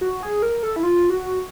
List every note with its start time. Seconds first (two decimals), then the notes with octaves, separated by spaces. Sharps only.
0.01 F#4
0.23 G#4
0.42 A#4
0.63 A4
0.76 E4
0.83 F4
1.10 F#4